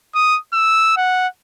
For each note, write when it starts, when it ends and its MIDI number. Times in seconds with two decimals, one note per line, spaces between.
0.15 0.38 87
0.53 0.96 88
0.97 1.27 78